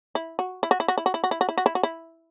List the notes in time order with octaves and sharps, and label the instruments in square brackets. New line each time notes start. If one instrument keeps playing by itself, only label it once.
[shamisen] E4
F#4
E4
F#4
E4
F#4
E4
F#4
E4
F#4
E4
F#4
E4
F#4
E4
F#4
E4